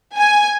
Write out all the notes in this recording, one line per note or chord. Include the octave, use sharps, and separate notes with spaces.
G#5